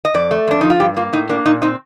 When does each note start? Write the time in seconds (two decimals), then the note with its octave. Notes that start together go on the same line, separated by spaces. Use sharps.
0.05 D#5
0.14 F2 D5
0.31 A3
0.47 F2 D4
0.61 F3 D#4
0.70 F4
0.80 G2 G4
0.97 A#3 F4
1.13 A2 D#4
1.29 A#3 D4
1.46 A#2 D#4
1.62 C4 D#4